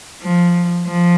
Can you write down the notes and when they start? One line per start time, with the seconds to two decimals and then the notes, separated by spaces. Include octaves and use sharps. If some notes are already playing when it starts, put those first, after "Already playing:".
0.22 F3
0.86 F3